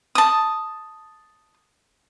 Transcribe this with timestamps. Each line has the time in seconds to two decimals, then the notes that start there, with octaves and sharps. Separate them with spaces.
0.15 A5 D#6